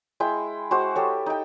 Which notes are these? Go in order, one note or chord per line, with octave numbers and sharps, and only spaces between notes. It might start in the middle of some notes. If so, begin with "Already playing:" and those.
G#3 E4 G5
G#3 F#4 C5
G4 A4 C#5
D#4 G5